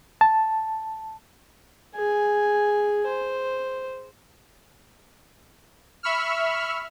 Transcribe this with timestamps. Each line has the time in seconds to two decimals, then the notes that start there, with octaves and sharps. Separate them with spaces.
0.21 A5
1.96 G#4 G#5
3.07 C5
6.03 E5 B5 C#6 E6 F6